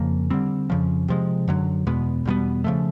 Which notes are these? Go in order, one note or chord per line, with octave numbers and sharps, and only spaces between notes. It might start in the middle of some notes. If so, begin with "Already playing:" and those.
Already playing: F2 C#3 F3 A#3
D3 G3 C4
F2 C#3 F3
C3 F3 G#3
F#2 D3 F#3
E2 B2 G#3 B3
E2 B2 G3 B3
C#3 F3 A3